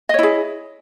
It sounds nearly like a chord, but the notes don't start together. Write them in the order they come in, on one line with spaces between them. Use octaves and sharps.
D#5 C#5 E4 G#4